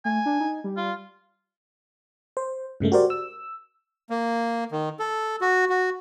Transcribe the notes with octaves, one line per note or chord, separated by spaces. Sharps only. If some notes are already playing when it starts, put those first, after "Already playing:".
A3 G#5
D4
D#4
G3
F4
C5
G2 C#3 G#3 A3
F#4 G4 A#4 C5 D5
E6
A#3
D#3
A4
F#4
F#4